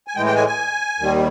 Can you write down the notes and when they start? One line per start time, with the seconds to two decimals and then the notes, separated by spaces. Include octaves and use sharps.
0.07 G#5
0.15 A2 E3 G#3 G5
0.26 G5
0.36 G#5
0.47 G#5
0.99 D#2 D#3 G3